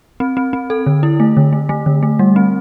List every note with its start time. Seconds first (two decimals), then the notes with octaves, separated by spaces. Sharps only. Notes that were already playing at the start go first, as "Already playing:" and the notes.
0.20 C4
0.37 C4
0.53 C4
0.70 A4
0.86 D3
1.03 E4
1.20 A3
1.37 D3
1.53 A3
1.69 A3
1.86 D3
2.03 A3
2.19 G3
2.36 C4